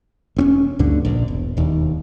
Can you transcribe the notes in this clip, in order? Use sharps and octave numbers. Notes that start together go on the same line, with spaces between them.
E1 C4 C#4
D2 G2 B2 D3
A#1
E1
E1 D#2